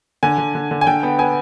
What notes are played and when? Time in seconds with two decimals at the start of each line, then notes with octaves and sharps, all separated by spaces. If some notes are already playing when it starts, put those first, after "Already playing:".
0.23 D3 G#5
0.38 D3
0.55 D3
0.71 D3
0.81 G#5
0.87 D3 G5
1.03 B3
1.19 B3 G#5